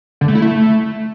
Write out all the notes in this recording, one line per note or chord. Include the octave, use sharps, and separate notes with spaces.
D3
A3
E4
A3